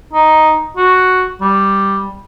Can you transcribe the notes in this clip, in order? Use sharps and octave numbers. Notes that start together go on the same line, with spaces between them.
D#4
F#4
G3